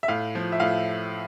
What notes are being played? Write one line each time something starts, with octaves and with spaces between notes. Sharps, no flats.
E5
A2 F5
F3
E5
A2 F5